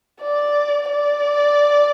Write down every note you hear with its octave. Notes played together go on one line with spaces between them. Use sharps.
D5
D5